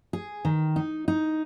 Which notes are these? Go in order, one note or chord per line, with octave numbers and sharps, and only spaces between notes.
G#4
D#3
D#4
D#4